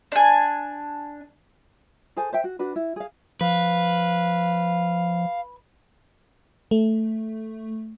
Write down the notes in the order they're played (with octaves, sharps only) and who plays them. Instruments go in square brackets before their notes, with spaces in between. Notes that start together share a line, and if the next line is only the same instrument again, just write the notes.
[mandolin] D4 G#5
[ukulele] G#4 A4 C5 G#5
C5 E5 G5
F#4
D4 F#4 B4
E4
G#4 F5
[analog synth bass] F3 [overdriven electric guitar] B4 [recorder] F5
[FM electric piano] A3